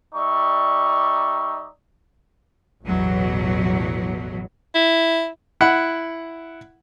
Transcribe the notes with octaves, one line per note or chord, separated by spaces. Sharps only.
G3 D#4 D5 E5 C#6
A1 E2 B2 F#3
E4
E4 F#5